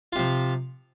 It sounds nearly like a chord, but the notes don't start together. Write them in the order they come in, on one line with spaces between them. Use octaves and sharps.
F4 C3 F3